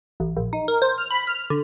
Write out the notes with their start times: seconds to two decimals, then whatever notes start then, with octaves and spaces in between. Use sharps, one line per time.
0.20 A1
0.37 A#1
0.53 D#4
0.68 A#4
0.82 C5
0.98 F6
1.11 B5
1.27 F6
1.50 D3